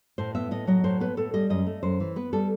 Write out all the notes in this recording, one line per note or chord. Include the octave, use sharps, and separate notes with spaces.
A2 C5
B3 E5
A2 D#5
F#3 D#5
A2 C5
B3 B4
A2 A4
G3 D#5
F#2 D#5
A3
F#2 C5
E3
B3 B4
G3 A4